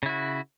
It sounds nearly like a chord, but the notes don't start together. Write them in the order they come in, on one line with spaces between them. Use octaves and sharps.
C#3 E4 F#4